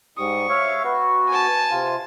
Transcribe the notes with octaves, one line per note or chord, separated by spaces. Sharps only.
G#2 G3 C#6 D#6
C#5 E5 F5
B3 F#4
G#5 A5
C3 F4